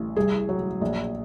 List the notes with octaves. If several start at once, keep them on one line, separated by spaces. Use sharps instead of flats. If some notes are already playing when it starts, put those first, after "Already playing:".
Already playing: A1
C2 G#4
F#3
A#1